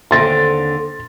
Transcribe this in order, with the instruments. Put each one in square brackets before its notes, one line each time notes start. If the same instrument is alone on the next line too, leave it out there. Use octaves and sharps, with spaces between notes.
[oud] D#2 D3 C4 [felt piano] C6 A6 A#6